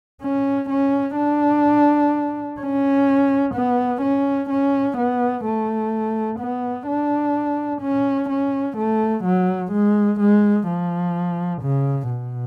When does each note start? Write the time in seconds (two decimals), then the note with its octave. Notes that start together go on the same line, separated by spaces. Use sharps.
0.22 C#4
0.70 C#4
1.17 D4
2.60 C#4
3.54 B3
4.02 C#4
4.50 C#4
4.97 B3
5.44 A3
6.39 B3
6.87 D4
7.82 C#4
8.29 C#4
8.77 A3
9.24 F#3
9.72 G#3
10.20 G#3
10.68 F3
11.62 C#3
12.10 B2